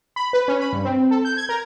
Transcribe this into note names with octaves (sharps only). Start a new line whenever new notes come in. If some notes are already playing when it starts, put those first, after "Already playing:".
B5
B4
C#4
B5
G2
C4
A4
G6
G#6
A#4